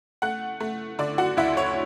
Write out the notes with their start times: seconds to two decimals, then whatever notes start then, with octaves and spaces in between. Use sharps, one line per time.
0.22 A3 F#5 F#6
0.60 A3
0.99 D3 D5 D6
1.18 F#4 F#5
1.37 D2 E4 E5
1.57 C#5